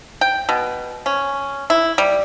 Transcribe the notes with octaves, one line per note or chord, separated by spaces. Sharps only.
G5
B2
C#4
E4
G3